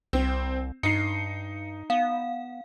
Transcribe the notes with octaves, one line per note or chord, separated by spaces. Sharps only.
C2 C4
G2 D#4 C7 C#7
B3 F5